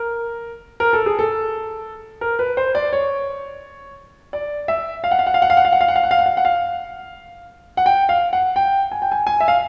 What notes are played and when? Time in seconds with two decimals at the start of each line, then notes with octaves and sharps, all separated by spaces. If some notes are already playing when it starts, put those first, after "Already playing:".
Already playing: A#4
0.80 A#4
0.93 A4
1.06 G#4
1.19 A4
2.21 A#4
2.39 B4
2.57 C5
2.75 D5
2.93 C#5
4.33 D5
4.68 E5
5.04 F5
5.11 F#5
5.19 F5
5.27 F#5
5.34 F5
5.42 F#5
5.50 F5
5.57 F#5
5.65 F5
5.72 F#5
5.81 F5
5.88 F#5
5.96 F5
6.03 F#5
6.11 F5
6.19 F#5
6.26 F5
6.37 F#5
6.45 F5
7.77 F#5
7.86 G5
8.09 F5
8.33 F#5
8.56 G5
8.92 G#5
9.02 G5
9.12 G#5
9.27 G#5
9.40 E5
9.48 F5